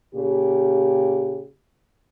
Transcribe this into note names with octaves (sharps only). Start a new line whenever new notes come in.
A#2 C#3 G4